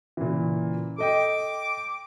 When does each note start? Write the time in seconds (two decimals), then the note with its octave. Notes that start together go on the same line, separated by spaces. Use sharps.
0.17 A#2 C#3 E3
0.98 A4 D#5 G5 D6